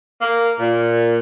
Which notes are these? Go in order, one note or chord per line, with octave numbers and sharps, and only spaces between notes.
A#3
A#2